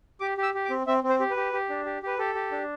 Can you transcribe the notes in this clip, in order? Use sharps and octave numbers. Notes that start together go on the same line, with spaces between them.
G4 D6
G4
E6
G4
D6
C4
C4 E5
C4
C5
G4
B4
G4
G4
D4
G4
G4 B4
G4 A4
G4
D4